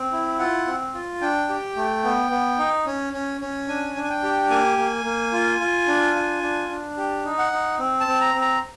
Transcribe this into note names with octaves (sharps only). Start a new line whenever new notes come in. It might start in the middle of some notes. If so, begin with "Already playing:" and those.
Already playing: C4
E4
F4 F#5
C4
F4
D4 G5
G4
A3
B3
B3
D#4
C#4
C#4
C#4
D4 G#5
D4
G#5
G5
G4
A#3 G#5
A#3
A#3
F4
F4
D4
F4
D4
D4
G4
D#4
F#5
D#4
C4
A5
C4
A#5
C4
A#5